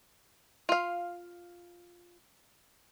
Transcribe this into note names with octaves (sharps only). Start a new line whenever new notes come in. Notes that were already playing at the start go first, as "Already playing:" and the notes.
F4 F5